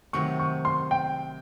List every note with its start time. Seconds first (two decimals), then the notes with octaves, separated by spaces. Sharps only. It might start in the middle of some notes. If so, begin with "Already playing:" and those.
0.13 C3 D#3 F#3 A3 C#6
0.39 C#6
0.65 C6
0.91 G5